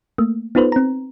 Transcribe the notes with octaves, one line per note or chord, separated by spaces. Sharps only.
A3 A#3
B3 D#4 F4 A4 B4 C5
C4 A#5